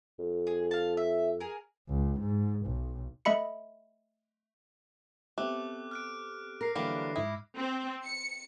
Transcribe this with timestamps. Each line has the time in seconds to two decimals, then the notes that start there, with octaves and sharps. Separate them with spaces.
0.19 F2
0.47 G#4
0.71 F5 A5
0.97 E5
1.40 G#4 A#4
1.89 C#2
2.20 G#2
2.66 B1
3.25 A3 D#5 E5 B5 C#7
5.38 A3 B3 C4 G4 D6 F#6
5.91 F6 F#6 D7
6.61 A#4 A#6 C7
6.75 D3 E3 F#3 G3 A#3 D4 D6 C7
7.16 G#2 E4 D#6
7.57 C4
8.04 C#7